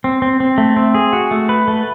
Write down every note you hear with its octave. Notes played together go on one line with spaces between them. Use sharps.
C4
C4
C4
A3
C4
G#4
F#4
A3
B4
A3